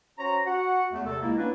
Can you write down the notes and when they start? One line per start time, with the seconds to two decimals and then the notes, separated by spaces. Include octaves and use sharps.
0.18 C#4 F#4 C5 C#5 A#5
0.46 F#4 F#5
0.92 E2 A3
1.06 C3 A4
1.22 C#2 A#3 E4
1.38 A#3 B3 C#4 D4 E4 B4